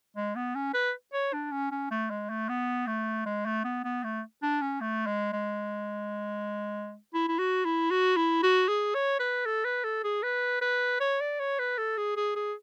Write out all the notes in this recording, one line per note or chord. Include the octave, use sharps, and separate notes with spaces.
G#3
B3
C#4
B4
C#5
D4
C#4
C#4
A3
G#3
A3
B3
A3
G#3
A3
B3
B3
A3
D4
C#4
A3
G#3
G#3
E4
E4
F#4
E4
F#4
E4
F#4
G#4
C#5
B4
A4
B4
A4
G#4
B4
B4
C#5
D5
C#5
B4
A4
G#4
G#4
G#4